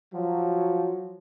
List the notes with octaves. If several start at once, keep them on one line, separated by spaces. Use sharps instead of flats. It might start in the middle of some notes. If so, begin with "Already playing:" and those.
F3 F#3